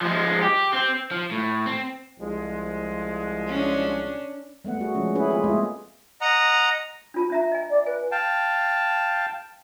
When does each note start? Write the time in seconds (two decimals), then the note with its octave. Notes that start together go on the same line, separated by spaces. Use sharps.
0.02 F3 G#3
0.43 G4
0.73 C4
1.11 F3
1.31 A2
1.66 C4
2.19 C2 F3 G#3
3.48 C#4 D4
4.64 G3 A3 B3 F#5
4.79 A3 F#4 G#4
4.95 F3 G#3 C#4
5.15 C#4 E4 G#4 B4
5.30 G#3 A3 C4 F4 G4 G#4
5.44 G#3 A#3 B3 E4 F4 D#5
6.21 D#5 F#5 A#5
7.14 D4 F4 A5
7.30 D4 E5 A#5
7.52 D#5 G#5
7.70 D5
7.86 B4 G#5
8.11 F5 G5 A5